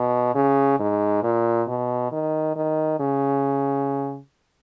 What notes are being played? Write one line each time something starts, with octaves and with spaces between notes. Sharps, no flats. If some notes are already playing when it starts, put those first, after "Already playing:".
Already playing: B2
C#3
G#2
A#2
B2
D#3
D#3
C#3